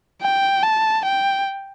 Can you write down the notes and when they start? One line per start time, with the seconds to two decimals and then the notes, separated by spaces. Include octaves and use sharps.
0.22 G5
0.63 A5
1.05 G5